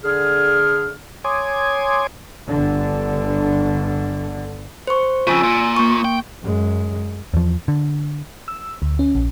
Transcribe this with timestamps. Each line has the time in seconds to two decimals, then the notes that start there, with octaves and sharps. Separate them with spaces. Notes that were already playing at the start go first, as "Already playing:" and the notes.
0.04 D3 G#4 F6
1.24 C#5 G#5 C6 D6 D#6 G#6
2.50 G1 D3
4.87 C5 C#6
5.27 F2 C#3 F4 G#5 E6
5.43 A#2
5.77 A#3 C#6
6.05 G5
6.43 F#2 G#3
7.34 E2 F3
7.68 D3
8.48 E6
8.82 D2
8.99 C#4
9.15 A#1